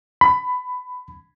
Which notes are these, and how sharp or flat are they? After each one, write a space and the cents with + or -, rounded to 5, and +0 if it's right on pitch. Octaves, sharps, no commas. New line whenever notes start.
B5 +20